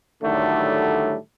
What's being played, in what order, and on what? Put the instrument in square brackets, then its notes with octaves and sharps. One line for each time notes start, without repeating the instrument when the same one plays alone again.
[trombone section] A2 D3 D#3 F#3 G3 A3